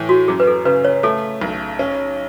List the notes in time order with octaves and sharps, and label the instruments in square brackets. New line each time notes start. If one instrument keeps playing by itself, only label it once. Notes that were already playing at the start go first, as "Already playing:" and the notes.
Already playing: [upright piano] A2 E3
[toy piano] F#4
[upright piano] F#2 [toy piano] G#4
[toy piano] B4
A4
[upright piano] C#3 [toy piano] B4
[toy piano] C#5
[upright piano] A3 [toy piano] A4
[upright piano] B1
C#4